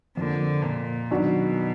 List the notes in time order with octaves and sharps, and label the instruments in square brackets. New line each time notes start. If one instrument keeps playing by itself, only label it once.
[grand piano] F2 F3 A#3 [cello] D3
[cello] A#2
[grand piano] F#2 D#3 F#3 D4 F#4 [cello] B2